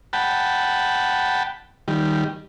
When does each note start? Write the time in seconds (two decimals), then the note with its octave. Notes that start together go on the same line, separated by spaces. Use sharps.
0.13 F#5 G5 A5 B5
1.88 D#3 G3